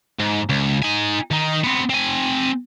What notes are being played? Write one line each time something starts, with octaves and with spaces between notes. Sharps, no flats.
G#2
C#2
D#4 G#5
D#3 D#4
B3 C4
C4 G#5